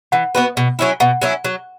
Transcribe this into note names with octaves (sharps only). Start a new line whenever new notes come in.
E3 F#5
B3 F#4 B4
B2
F#3 C#4 E4
B2 F#5
F#3 C#4 E4
F#3